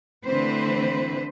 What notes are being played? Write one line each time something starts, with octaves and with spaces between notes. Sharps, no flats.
D3 E3 A3 C4 B4 C5